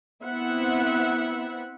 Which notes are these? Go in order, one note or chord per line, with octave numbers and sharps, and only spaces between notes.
B3 C4 E4 E5 F#5